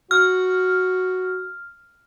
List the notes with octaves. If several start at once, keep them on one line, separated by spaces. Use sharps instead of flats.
F#4 F6